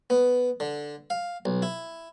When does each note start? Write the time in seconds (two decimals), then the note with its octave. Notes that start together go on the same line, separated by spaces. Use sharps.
0.10 B3
0.60 D3
1.10 F5
1.45 B1
1.62 E4